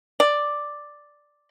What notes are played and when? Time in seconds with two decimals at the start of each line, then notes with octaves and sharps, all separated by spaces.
0.20 D5